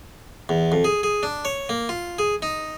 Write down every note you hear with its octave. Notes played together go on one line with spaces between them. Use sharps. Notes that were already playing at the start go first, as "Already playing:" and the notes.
E2
F2
G#4
G#4
D4
C#5
A#3
F4
G#4
D#4